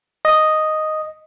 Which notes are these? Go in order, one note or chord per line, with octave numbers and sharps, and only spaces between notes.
D#5